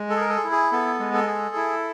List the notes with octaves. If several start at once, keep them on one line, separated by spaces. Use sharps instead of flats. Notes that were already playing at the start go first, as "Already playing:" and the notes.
Already playing: G#3
A4
G#4 A#4
A4
E4
G#4
B3 A4
G#3
A4
G#4
E4